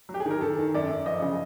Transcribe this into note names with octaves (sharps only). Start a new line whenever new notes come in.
F#3
G4
G#4
D#3
A#4
D#3 A4
D#3
F#2 D5
F#2
F3 D#5
C#3